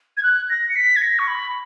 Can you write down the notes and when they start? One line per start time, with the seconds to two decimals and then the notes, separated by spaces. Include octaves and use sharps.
0.17 G#6
0.23 F#6
0.49 A#6
0.69 C#7
0.76 B6
0.96 G#6
1.01 A#6
1.19 C#6
1.27 B5